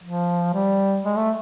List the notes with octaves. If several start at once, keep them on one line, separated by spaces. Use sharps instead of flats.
F3
G3
G#3
A3